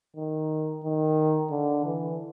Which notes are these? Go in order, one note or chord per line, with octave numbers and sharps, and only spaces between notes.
D#3
D#3
D3
E3